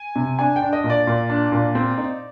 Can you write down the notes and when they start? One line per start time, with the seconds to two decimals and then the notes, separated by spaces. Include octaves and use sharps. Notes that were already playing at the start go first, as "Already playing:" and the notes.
Already playing: G#5
0.16 C3
0.39 D4 G#5
0.56 G5
0.62 D4
0.73 D#5
0.84 A#2
0.90 D5
1.07 A#2
1.30 D4
1.52 A#2
1.75 C4
1.98 D#4